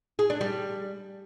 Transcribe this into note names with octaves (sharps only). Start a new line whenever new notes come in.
G#4
D4
G3